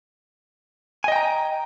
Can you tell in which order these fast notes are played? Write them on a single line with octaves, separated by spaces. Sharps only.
G#5 D#5 G5 A#5